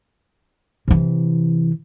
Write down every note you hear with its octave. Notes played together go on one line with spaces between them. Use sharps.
C3 E3